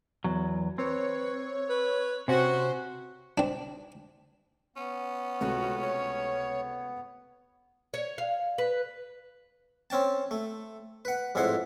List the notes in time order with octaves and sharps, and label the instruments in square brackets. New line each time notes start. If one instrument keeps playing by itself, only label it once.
[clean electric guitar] E2 F#3
[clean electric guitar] C4 [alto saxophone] B4 [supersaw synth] C#5
[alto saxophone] B4
[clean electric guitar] C3 C#4 [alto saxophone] C4 [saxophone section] F#4 [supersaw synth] C5
[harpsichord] C4 D4
[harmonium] B3 [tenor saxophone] C#4
[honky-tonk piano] C#2 C3 A3 [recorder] F#4
[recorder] C#5
[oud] C#5
F5
B4
[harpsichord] C4 C#4 G5 A5
A3
B4 F#5
A1 F2 G#2 E4 F#5 C6